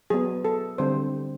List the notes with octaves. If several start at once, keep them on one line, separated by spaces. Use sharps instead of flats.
F#3 B3 G#4
A4
D3 G3 C4 C5